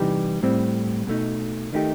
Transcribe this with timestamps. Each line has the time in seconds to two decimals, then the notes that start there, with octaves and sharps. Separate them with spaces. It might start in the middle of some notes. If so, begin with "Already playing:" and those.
Already playing: C3 E3 G3 D#4 G4
0.43 A2 G3 C4
1.07 B2 A3 D#4
1.73 D#3 A3 D#4 G4